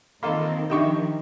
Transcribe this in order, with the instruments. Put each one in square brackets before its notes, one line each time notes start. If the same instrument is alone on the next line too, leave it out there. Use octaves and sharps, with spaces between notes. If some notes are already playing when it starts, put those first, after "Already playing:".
[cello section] D#3 C4 [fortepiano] A#3 F4 A4
[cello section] D#3 F3 [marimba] D4 D#4 G4 [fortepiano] D#5 G5 C#6